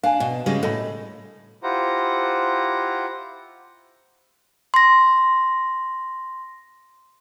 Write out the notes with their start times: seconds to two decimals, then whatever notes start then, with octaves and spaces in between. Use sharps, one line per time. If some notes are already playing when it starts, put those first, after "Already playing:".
0.03 D4 F5 G#5
0.20 B2
0.46 C#3 G3 G#3 F#4 D#5
0.63 A2 A4 D#5 B5
1.63 E4 F4 G4 C5 F#5 A#5
4.74 C6 A#6